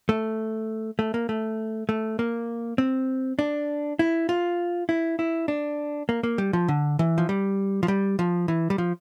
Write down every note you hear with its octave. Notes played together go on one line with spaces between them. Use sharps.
A3
A3
A#3
A3
A3
A#3
C4
D4
E4
F4
E4
E4
D4
A#3
A#3
G3
F3
D3
E3
F3
G3
F3
G3
F3
E3
G3
F3